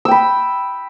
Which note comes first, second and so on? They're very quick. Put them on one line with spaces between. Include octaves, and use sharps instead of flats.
E6 G5 B5